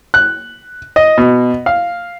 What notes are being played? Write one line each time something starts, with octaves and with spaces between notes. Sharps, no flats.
F#6
D#5
B2
F5